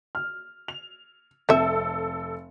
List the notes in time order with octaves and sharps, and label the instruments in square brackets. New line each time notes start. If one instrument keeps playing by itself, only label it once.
[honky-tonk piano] F6
F7
[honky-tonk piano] F1 A4 [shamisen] C4 E5